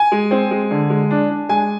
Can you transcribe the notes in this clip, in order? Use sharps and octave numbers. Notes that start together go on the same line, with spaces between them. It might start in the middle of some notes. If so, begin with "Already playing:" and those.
Already playing: G#5
G#3
C4
G#3
D3
G#3
D4
D4
G#3 G#5